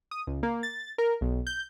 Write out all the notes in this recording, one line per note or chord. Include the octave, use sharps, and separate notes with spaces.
D#6
C#2
A#3
A6
A#4
B1
G6